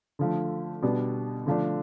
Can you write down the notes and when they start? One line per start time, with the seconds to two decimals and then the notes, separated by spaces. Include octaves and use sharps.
0.19 D3 F3 A3
0.82 B2 G3 B3 D4
1.46 D3 F3 A3 D4